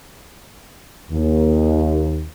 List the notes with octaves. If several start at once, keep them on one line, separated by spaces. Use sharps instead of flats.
D#2